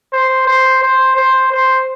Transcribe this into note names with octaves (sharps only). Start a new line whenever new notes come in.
C5
C5
C5
C5
C5